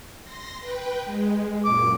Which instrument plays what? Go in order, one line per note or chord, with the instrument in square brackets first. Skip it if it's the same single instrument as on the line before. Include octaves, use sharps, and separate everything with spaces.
[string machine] C6 A#6
B4 G5
G#3
[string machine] F#2 A#2 [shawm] D6